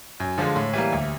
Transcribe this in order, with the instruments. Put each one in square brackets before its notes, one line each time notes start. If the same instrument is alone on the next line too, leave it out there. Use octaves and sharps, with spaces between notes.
[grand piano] F#2
D3 F3 G#3
A2
E3 G3 A#3
D2